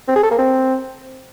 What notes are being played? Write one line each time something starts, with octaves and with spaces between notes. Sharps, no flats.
C4
G#4
A4
A#3
C4